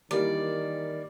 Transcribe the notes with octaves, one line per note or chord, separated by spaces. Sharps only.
D#3 E3 G3 A#3 D5